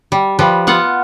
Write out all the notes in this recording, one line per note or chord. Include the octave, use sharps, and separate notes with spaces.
G3
F3 G3 B4
B3 F4 F#5